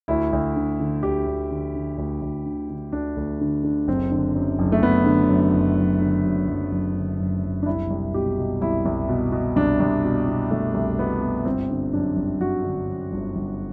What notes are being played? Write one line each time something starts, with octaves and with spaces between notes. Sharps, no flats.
D2 E4
D2
D3
D3
D2 G4
D2
D3
D3
D2
D2
D3
D3
D2 D4
D2
D3
D3
F#1 C4
D3
F#2
F#1
A3
F#1 B3
D3
F#2
F#1
F#1
D3
F#2
F#1
F#1
D3
F#2
F#1
D4
C2 E4
C2
B2 G4
B2
C2 E4
C2
B2
B2
C2 D4
C2
B2
B2
C2 A3
C2
B2 B3
B2
G1 C4
D3
F#2 D4
G1
G1 F#4
D3
F#2
G1
G1